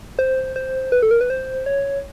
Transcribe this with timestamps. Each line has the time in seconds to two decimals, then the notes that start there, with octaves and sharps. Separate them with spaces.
0.19 C5
0.56 C5
0.92 B4
1.02 A4
1.11 A#4
1.21 B4
1.30 C5
1.66 C#5